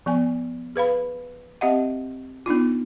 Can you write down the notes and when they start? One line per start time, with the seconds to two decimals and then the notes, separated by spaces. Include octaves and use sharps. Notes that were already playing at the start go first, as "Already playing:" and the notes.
0.06 F3 B3 G#5
0.76 G#4 B4 F5 B5
1.61 C4 G4 D#5 E5 F#5
2.46 B3 D4 D#4 F4